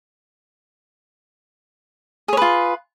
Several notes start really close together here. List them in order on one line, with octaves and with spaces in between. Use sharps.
G#4 C#5 B4 F4